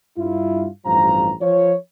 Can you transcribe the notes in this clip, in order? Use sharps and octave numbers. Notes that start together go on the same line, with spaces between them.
G2 E4 F4
A1 G2 F3 A#5
F3 C#5